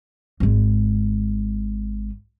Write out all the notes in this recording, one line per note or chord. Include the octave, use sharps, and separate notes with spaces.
G#1 G#3